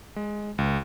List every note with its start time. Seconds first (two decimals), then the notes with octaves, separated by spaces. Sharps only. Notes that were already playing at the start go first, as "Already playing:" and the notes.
0.16 G#3
0.58 C#2